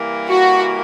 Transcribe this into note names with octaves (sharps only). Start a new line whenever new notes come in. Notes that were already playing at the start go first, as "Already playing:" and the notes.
Already playing: E3 G3 A#3
F#4